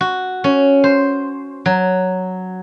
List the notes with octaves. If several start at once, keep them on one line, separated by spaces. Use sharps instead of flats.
F#4
C#4
C5
F#3